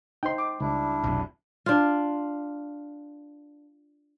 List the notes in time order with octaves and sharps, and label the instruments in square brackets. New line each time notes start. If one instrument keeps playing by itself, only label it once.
[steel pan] D#4 C5 [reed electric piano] G5 C6
[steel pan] D6
[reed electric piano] C#2 [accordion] G3 D4 E4
[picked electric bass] F1 B1
[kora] D4 F4